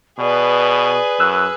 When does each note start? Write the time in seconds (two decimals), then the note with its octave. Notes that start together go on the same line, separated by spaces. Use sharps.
0.19 B2 G#4 B4 D5
1.20 F#2 E6 F#6